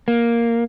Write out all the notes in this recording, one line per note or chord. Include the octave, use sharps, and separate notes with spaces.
A#3